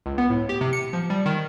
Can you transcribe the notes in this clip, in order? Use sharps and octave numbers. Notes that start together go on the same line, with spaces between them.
C#2
B3
A2
G4
C3
C#7
F3
G3
D#3